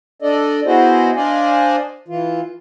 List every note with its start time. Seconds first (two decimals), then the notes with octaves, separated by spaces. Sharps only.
0.22 D4 A4 D5 D#5
0.66 B3 E4 F#4 G#4 C5 D#5
1.16 D4 C5 D5 D#5 F5 G#5
2.08 E3 F4